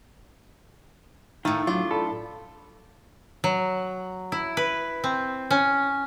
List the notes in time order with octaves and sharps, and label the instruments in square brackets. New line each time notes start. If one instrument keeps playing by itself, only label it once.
[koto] A2 A3 [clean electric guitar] D#3 [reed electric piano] F5
[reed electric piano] F#3 [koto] D4 [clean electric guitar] F4
[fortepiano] A4 [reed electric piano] D5 A5 B5
[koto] F#3
E4
B4
C4
C#4